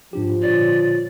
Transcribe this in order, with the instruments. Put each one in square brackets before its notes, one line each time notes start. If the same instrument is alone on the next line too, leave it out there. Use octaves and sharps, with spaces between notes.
[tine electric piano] G#2 D4 G4 [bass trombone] F3
[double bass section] A#2 D3 [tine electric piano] F4 C#5 [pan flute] D5